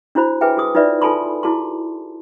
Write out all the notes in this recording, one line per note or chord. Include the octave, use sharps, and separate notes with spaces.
D4 E4 F#4 C5 B5
G#4 B4 E5 G5 G#5
F#4 G#4 D#6
D#4 F4 B4 D5 E5
F4 A4 G#5 A5 B5 C6
E4 F#4 G#4 A5 C6